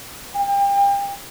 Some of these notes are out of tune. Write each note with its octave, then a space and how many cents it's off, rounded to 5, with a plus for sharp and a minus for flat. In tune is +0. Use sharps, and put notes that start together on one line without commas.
G5 +35